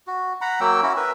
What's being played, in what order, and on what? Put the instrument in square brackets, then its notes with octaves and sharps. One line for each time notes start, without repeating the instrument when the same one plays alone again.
[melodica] F#4
F#5 A#5 B5
F#3 A#3 G5 E6
C#4 E4 F#4
A#4 B4 E5